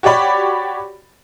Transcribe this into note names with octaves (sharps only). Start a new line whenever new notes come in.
F#4 G4 C#5 D5 B5